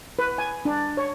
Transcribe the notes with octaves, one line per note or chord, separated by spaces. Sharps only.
B4
G#5
D4
C#5